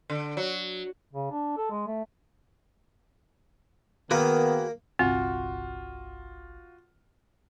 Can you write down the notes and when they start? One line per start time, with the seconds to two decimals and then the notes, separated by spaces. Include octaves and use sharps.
0.10 D3
0.37 F#3
1.13 C#3
1.32 D4
1.57 A4
1.71 G#3
1.87 A3
4.11 D#3 A#3 B3 F#4 G#4 B4
4.99 G1 C2 C4 F4 F#4